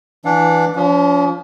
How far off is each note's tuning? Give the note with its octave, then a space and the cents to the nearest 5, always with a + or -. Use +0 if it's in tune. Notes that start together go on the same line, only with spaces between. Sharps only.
E3 +0 D4 +0 F5 +45
F3 +0 C#4 +45